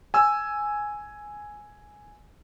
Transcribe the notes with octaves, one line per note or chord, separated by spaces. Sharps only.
G#5 E6